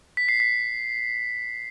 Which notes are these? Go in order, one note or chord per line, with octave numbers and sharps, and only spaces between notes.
B6
C7
B6